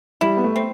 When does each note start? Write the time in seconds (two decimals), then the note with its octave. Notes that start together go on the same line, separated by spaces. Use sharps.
0.21 G3 E4
0.37 B3
0.44 A3
0.56 C4